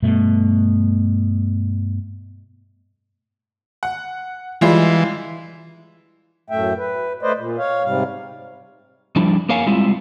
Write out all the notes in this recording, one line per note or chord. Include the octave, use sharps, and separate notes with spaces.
G2 B2 A3
F#5
E3 G3 G#3 F4
F#2 A2 A3 E5 G5
B4
A3 B4 C5 D5 D#5
A#2
C#5 F5
G#2 C3 G3 F5
F3 G3 D4 E4
A#3 A#4 C#5 F5 F#5 G#5
G3 G#3 C4 E4 F4